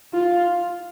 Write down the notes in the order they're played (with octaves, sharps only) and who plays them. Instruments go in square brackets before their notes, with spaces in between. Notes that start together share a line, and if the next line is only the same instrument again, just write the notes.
[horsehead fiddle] F4